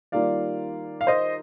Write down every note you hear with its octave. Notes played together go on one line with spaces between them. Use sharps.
D#3 G3 A#3 F4 D5 F5
F5
C5 D#5